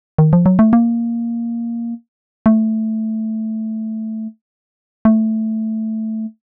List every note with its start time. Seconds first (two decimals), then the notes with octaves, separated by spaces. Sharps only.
0.18 D#3
0.33 F3
0.46 F#3
0.59 A3
0.73 A#3
2.46 A3
5.05 A3